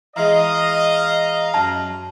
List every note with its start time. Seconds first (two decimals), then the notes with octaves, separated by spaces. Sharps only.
0.16 E3 G#3 D#5 F5 A#5
1.54 F#2 A5